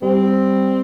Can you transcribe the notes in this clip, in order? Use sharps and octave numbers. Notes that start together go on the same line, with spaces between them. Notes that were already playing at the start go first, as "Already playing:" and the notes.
G3 C4